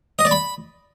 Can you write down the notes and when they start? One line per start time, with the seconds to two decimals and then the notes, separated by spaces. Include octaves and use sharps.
0.19 D#5
0.25 D5
0.31 B5